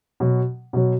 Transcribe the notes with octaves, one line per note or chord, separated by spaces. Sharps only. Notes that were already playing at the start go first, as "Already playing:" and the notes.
B2 F#3
B2 F#3